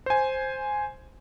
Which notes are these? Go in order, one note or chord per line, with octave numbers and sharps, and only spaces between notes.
C5 G#5